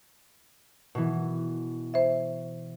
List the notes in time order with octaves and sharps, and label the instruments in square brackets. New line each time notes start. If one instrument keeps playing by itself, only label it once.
[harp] B2 E3
[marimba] C5 E5